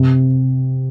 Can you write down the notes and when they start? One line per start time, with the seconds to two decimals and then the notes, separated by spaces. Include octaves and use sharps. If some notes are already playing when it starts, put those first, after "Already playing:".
Already playing: C3